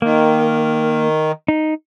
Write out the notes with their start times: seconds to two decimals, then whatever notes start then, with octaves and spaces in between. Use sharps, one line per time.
0.02 D#3 A#3
1.48 D#4